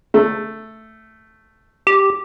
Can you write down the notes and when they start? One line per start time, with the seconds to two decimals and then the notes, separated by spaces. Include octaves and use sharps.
0.14 A3
1.87 G4